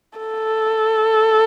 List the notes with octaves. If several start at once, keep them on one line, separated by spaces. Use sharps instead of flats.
A4